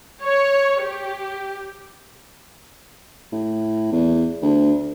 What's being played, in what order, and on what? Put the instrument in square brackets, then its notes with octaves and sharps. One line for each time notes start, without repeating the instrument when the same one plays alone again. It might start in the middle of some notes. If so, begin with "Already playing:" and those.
[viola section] C#5
G4
[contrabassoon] A2
E2
D2